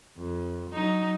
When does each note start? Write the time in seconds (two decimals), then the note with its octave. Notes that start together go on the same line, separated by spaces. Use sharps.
0.18 F2
0.71 F#3 D#4